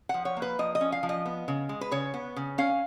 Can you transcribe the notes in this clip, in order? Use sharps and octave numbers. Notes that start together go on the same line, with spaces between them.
F3 F#5
C#5
A#3
B4
F3 D#5
D#5
C#4
F5
F3
D#5
B3
C#3
G#3
B4
C#3 C#5
B3
C#3
C#4 F5